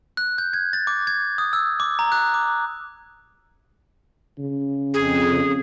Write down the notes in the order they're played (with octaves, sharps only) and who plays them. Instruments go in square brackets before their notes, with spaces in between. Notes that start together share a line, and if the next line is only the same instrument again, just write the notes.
[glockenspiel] F#6
G6
G#6
A6
D6
G#6
D#6
E6
D6
A#5
F#6
D6
[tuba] C#3
[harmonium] F2 [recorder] G#4
[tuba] C#3